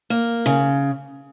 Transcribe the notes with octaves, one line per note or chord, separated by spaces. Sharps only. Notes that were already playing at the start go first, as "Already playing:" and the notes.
A#3
C#3